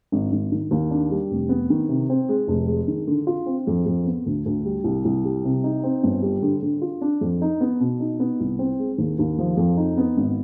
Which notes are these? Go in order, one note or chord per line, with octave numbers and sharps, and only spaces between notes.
G#1
G#1
D#3
D#2
D4
G3
F1
B3
D#3
C3
C4
G#3
F1
G#3
D#3
D3
F4
C4
F2
F2
B3
D2
D2
G3
C2
C2
G3
C3
D#4
C4
G1
G3
D3
D3
F4
D4
F2
D#4
B3
B2
D#4
B3
C2
C4
G#3
D#2
D#2
F3
F2
D#4
B3
G#1